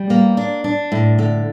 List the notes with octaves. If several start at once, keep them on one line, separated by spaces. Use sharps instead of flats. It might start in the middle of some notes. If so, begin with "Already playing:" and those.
Already playing: G3
A#3
D4
D4
A2
D3